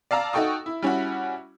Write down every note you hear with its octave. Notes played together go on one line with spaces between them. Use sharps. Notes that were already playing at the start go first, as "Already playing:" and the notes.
D5 F5 A5 A#5 E6
D#4 F#4 A4 G5 C#6 D#6
E4
G3 C#4 E4 F#4